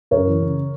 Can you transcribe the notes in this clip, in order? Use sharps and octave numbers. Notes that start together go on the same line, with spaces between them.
F#2 A#4 C#5
E3
C#3